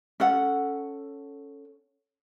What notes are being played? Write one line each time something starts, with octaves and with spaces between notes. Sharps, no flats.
C#4 A4 F#5